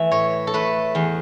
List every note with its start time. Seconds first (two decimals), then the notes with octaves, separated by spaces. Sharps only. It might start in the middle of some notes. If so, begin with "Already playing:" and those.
Already playing: E3 A3 E5
0.11 A2 C#5
0.47 A4
0.54 A3 B4
0.95 E2